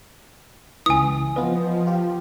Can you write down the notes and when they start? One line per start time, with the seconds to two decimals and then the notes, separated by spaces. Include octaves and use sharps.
0.86 C#2 E3 G#5 D#6
1.36 F3 B3 F4 B4 D#5
1.87 F4 G4